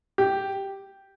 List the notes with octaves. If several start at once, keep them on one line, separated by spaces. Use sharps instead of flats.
G4